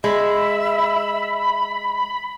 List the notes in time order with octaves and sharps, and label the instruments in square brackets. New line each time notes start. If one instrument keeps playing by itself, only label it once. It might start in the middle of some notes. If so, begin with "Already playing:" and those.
[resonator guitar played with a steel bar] G#3 [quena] E5 [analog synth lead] B5